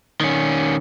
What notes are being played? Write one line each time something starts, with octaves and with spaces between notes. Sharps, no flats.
D#3 C#4